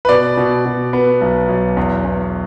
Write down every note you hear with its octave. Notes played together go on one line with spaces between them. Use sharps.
B4
B2 D5
B2
B2
B3
B1
B1
E2
E2